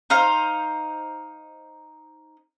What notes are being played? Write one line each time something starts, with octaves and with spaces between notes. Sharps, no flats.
D#4 C5 F5